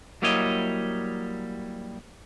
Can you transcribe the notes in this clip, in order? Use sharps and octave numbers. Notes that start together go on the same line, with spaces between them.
F#3 G3 A#3 E4 C#5 D#5